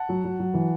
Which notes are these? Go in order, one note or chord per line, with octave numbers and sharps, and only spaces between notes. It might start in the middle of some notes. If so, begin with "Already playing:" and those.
Already playing: F#5 A5
F#3
F#3
F#3
E3